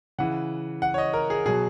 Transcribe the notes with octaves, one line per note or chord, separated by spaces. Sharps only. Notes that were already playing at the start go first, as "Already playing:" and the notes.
C#3 E3 F#5
F#5
C#5
D#5
A#4
G#4
B2 F#3 G#4